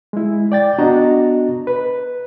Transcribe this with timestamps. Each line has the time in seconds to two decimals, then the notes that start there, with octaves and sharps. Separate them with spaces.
0.13 G#3 E4
0.52 D5 G5 A6
0.78 B3 D4 F#4 D#5 A#5
1.67 B4